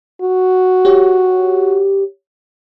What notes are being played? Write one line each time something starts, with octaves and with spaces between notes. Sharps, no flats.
F#4
G4 C#5